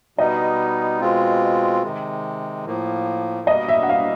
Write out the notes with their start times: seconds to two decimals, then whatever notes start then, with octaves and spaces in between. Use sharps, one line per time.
0.18 B2 G3 B3 D#4 D#5
1.00 B2 G#3 C4 F4
1.83 C3 D#3 G#3
2.66 A2 F3 A#3
3.47 B2 G3 A#3 D#5
3.69 E5
3.83 F#5
3.89 F5